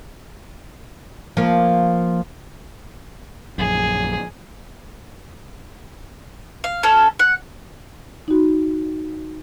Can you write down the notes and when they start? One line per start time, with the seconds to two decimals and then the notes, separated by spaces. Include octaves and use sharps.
1.37 F3 A#3
3.58 A#1 F#2 G#4
6.64 F5
6.83 C#4 A4 A5
7.19 F#5
8.28 D#4 F#4